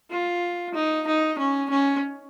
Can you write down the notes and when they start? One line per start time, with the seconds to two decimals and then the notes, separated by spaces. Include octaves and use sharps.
0.11 F4
0.74 D#4
1.07 D#4
1.38 C#4
1.70 C#4